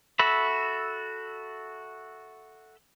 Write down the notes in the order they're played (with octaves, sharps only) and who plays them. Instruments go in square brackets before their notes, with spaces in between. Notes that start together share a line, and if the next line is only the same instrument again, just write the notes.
[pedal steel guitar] F#4 A4 E5 B5